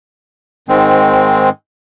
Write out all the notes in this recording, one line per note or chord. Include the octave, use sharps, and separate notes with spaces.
G#2 D#3 G#3 C4